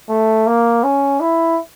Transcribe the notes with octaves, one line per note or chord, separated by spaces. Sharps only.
A3
A#3
C#4
E4